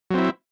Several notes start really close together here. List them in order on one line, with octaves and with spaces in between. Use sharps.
F#3 C4 E4